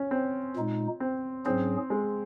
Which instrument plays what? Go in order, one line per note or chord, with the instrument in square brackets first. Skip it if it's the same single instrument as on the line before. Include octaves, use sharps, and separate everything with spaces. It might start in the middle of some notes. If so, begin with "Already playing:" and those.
Already playing: [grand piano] C#4
C4
[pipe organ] A#2 G#3 D#4
[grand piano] C4
[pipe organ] G#2 F#3 C#4 G#4 [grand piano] C4
[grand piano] G#3